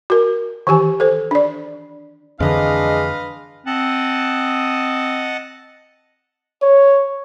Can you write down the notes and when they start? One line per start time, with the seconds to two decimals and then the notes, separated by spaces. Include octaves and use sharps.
0.10 F#4 A#4
0.67 D#3 E3 G4 G#5
1.00 A4 C5
1.31 D4 D5
2.40 F2 D3 E3 G#3 D4 B4 D#5 F5
3.66 C4 D#5 F#5 A5
6.62 C#5